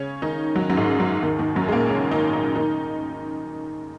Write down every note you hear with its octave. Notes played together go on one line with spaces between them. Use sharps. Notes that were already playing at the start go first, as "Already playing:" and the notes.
Already playing: C#3 C#4
D#3 D#4
F#3
D#3
F#2 F#3
G#2 G#3
F#2 F#3
D#2 D#3
D#2 D#3
F#2 F#3
G#3
A#2 A#3
C#3 C#4
D#3 D#4
D#3 D#4
D#3 D#4